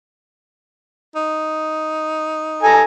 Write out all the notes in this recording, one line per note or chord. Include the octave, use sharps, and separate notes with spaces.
D#4
A4 G#5 A#5